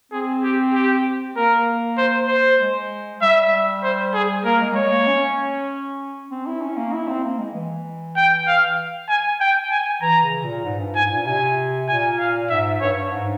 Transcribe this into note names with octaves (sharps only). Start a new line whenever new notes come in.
C4 G#4
G4
G4
A#3 A#4
C5
C5
G#3
G3 E5
C5
G#4
A#3 A#4
G#3
G3
G#3 C#5
A#3
C#4
C4
E4
C#4
A#3
E4
C4
A#3
G#3
E3
G5
F5
G#5
G5
G#5
E3 A#5
C#3
A#2
G#2
G2
G#2 G#5
G#2
A#2
C3 G#5
A#2 G#5
F5
G#2 E5
G2 C#5
G#2